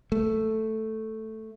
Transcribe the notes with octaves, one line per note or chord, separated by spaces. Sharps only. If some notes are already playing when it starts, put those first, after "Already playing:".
A3